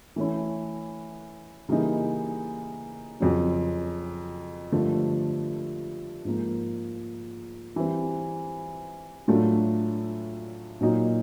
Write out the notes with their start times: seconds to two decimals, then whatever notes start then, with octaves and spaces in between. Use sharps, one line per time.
0.16 E3 A3 C#4 E4
1.69 C#3 E3 G3 A#3 D#4
3.20 F2 C#3 F#3
4.72 G2 D3 F3 A3
6.25 G#2 F3 A#3
7.76 E3 G3 C4
9.28 A2 F#3 A3 D4 F4
10.81 A#2 F#3 A#3 D#4